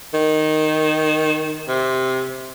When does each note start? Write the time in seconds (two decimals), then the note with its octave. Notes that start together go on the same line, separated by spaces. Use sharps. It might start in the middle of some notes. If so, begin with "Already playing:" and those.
0.14 D#3
1.68 C3